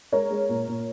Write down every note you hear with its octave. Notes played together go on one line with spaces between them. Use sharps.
G#3 A#4 C#5
G#3
A#2
A#2